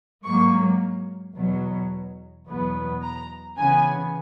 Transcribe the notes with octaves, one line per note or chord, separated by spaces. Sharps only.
G#2 F#3 A#3 C#6
E2 B2 F#3
E2 B2 F#3 B3
A#5
C#3 E3 B3 G#5